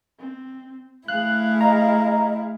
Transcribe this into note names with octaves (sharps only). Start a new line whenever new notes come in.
C4
A3 E4 G#4 F5 F#6
D#5 A#5